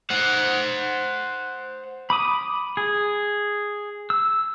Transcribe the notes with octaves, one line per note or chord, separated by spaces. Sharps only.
C5 F#5
B5 D6 D#6
G#4
E6